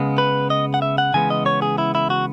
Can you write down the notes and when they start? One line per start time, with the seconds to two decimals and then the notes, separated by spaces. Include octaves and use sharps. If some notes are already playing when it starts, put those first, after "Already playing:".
Already playing: C#3 G#3 B3
0.18 B4
0.50 D#5
0.74 F#5
0.82 E5
0.98 F#5
1.14 C#3 E3 G#3 B3 G#5
1.30 D#5
1.46 C#5
1.62 G#4
1.78 E4
1.95 E4
2.10 F#4